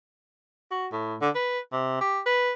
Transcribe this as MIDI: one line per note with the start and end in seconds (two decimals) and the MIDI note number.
0.71 0.87 66
0.92 1.16 45
1.22 1.30 50
1.35 1.59 71
1.73 1.97 48
2.01 2.20 67
2.26 2.52 71